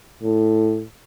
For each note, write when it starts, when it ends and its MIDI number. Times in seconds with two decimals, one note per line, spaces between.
0.23 0.83 45